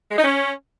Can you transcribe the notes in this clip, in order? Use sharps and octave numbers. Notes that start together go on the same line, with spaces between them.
G#3
D#4
C#4